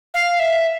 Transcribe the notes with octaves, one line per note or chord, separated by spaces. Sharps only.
F5
E5